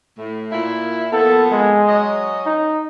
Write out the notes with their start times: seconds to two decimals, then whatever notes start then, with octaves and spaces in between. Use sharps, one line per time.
0.18 A2
0.52 A#2 E4
1.13 F3 A#3 B3 A4
1.52 G#3
1.89 F#3 C#4 D#5
2.46 D#4